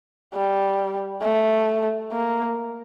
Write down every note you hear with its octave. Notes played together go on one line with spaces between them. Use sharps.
G3
A3
A#3